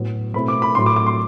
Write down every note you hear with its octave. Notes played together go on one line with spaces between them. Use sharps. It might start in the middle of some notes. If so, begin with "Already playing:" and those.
Already playing: A2 F#3 B3
B2 A3 C4 E4 B5
D6
B5
A2 F#3 A3 C6
D6
D6
C6